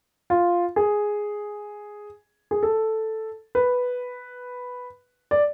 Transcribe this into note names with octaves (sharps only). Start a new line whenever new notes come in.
F4
G#4
G#4
A4
B4
D5